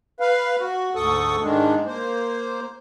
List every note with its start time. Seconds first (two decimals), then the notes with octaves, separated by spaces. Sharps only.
0.20 B4 F5
0.60 F#4
0.95 D2 G#2 A4 C#6 D#6
1.42 G#2 D#3 G#3 D4
1.86 A#3 C5